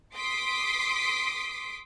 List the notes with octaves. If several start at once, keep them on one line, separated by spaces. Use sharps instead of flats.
C6 D6 D#6 B6 C7 D7